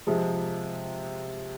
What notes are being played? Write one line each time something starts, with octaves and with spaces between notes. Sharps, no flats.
C3 F3 G#3